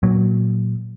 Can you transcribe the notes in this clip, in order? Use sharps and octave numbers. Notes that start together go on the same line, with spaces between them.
A#2 F#3